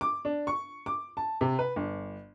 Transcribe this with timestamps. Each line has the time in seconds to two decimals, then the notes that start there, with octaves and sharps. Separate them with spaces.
0.01 D6
0.25 D4
0.47 C#6
0.86 D6
1.17 A5
1.41 C3
1.59 B4
1.76 G1